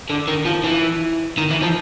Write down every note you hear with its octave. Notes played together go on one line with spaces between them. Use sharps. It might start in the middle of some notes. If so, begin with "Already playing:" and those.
D3
D#3
F3
E3
D#3
E3
F3